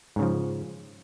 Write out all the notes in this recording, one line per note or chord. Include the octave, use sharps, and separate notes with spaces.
G#2 C#3 F3